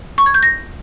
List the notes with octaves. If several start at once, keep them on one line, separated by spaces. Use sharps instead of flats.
C#6
G#6
G6
A#6